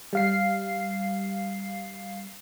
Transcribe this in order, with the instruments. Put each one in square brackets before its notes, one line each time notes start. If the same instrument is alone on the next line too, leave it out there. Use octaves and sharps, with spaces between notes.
[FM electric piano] G3 F5 C7